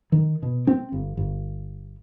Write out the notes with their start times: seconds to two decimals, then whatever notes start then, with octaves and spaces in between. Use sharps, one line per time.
0.12 D#3
0.43 B2
0.67 C4
0.92 G1
1.17 G1